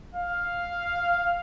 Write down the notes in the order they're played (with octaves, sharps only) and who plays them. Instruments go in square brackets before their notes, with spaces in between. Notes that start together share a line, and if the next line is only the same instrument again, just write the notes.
[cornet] F5